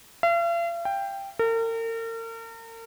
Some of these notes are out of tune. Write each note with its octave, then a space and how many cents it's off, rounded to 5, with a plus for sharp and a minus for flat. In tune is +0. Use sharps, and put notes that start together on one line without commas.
F5 -45
G5 +5
A#4 -40